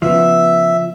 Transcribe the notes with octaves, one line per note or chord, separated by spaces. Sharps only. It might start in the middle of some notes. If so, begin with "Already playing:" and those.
C#3 F3 B3 E5